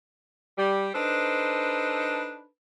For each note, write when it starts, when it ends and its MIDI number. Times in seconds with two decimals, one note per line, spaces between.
0.58 0.90 55
0.94 2.46 62
0.94 2.46 63
0.94 2.46 69
0.94 2.46 71
0.94 2.46 72